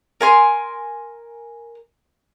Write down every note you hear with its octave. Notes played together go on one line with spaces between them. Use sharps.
A#4 G#5 C6